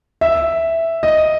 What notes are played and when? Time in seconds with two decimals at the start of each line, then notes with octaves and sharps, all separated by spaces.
0.21 E5
1.03 D#5